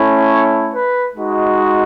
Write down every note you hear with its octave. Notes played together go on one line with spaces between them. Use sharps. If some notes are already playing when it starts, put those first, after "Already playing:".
Already playing: A3 C#4 E4
C#5
B4
G#3 D#4 F#4